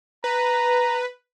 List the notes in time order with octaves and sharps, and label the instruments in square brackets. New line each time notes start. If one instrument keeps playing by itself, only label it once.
[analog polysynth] B4 [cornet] A#5